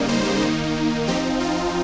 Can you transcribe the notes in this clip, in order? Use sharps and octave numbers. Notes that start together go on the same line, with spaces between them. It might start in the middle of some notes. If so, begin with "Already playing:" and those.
Already playing: C#3 G3 A#3 D#4
C5
D#3 A#3 D#4
F3 C4 D#4 G4
F4